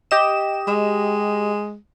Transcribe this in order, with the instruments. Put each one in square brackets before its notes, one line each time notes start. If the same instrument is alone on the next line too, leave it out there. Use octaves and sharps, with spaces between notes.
[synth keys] G4 D#5 E7
[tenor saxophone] G#3